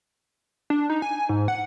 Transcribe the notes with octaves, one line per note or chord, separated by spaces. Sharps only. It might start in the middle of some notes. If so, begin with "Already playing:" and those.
D4
D#4
G#5
G#2
F#5